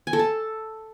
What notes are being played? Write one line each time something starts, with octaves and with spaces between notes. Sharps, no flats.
G#5
A4
A5